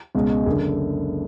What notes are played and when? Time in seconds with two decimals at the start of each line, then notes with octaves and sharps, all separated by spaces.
0.15 C#2 B2 G#3
0.46 F#1 D3 G#4